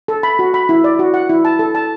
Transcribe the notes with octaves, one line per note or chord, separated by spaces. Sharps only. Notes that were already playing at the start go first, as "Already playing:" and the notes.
A4
B5
F#4
B5
E4
D5
F#4
F#5
E4
A5
A4
A5